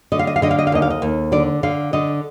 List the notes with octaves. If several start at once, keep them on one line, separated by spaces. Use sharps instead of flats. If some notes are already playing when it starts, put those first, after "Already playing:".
D3 D#5
F5
D#5
F5
D3 D#5
F5
D#5
F5
D#2 D#5
F5
D#5
D#2
D3 D5
D3 F5
D3 D#5